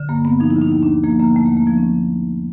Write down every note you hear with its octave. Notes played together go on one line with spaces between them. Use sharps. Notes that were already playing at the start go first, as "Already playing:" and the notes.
Already playing: D3
G2 A#3
G2 B3
F3 D#4
E4
D3
D#4
D#2 D#4
D4
D#2
F3 A#3
D3 A#3
D#2 A3
A#3
D#2
A#3
F3 B3
C#4